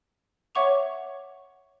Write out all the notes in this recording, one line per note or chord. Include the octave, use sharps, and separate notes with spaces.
C#5 E5 F#5 C#6 D6 F7